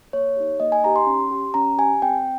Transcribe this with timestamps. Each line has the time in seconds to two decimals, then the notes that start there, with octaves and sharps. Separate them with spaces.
0.13 A#3 C#5
0.36 D#4 G4
0.60 A#3 D#5
0.72 G#5
0.83 D#4 G4 A#5
0.96 C6
1.07 C#4
1.31 G4
1.54 C#4 A#5
1.78 G4 G#5
2.02 C4 G5